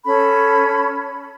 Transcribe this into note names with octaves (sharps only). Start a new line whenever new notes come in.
C#4 A4 B5